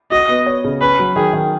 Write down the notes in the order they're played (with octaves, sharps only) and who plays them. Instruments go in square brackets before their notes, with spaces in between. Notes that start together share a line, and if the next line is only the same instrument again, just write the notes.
[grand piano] F#4 [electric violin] D#5
[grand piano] B3
C#5
C#3
[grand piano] C#4 [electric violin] B4
[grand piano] F#3
[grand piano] D#3 [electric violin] G#4
[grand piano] D#3